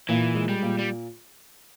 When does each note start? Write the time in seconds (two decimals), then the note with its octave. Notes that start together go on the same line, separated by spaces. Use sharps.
0.09 A#2 E3
0.35 G#3
0.49 G3
0.62 A#2
0.79 G3